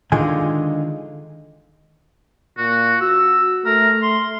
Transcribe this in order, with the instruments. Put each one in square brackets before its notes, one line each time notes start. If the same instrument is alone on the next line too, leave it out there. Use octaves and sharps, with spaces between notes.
[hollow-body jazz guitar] D3 D#3 G#3 D#4 F4 G#5
[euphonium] A#2 [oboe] F#4
[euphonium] F#4 [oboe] E6
[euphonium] A3 [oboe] A#4
[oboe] C6